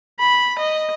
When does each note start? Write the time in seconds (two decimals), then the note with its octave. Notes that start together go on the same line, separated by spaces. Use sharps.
0.20 B5
0.59 D#5